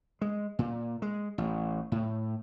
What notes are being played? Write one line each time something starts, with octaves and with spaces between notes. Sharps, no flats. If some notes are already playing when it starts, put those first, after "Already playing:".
G#3
A#2
G#3
A1
A2